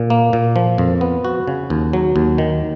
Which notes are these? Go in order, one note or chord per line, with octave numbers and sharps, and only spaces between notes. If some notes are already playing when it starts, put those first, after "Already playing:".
Already playing: A#2
A#3
A#2
F3
F2
B3
F#4
C#3
D#2
F#3
D#2
D#3